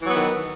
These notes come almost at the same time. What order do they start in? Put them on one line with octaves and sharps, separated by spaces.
E3 F#3 B3 D#3